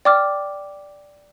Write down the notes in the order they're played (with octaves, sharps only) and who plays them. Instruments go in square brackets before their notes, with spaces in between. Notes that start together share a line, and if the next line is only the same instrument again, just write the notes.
[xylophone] D5 G5 D6 F6